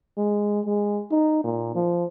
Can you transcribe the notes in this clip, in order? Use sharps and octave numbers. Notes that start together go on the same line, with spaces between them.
G#3
G#3
D#4
A#2
F3